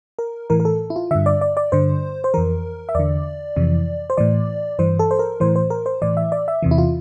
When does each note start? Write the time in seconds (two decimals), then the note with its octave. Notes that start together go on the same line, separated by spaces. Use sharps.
0.19 A#4
0.50 A2 E3 A#4
0.60 A#4
0.65 A4
0.90 E4
0.96 F4
1.11 G2 D3 E5
1.26 D5
1.41 D5
1.57 D5
1.72 G2 D3 C5
2.24 C5
2.34 F2 E3 A#4
2.89 E5
2.95 E2 D3 D5
3.56 F2 C3 E3
4.10 C5
4.17 A2 E3 D5
4.79 G2 E3 C5
4.99 A4
5.11 C5
5.19 A#4
5.40 A2 E3 C5
5.56 C5
5.70 A#4
5.86 C5
6.02 A2 E3 D5
6.17 E5
6.32 D5
6.48 E5
6.62 E2 C3 E3
6.71 E4
6.78 F4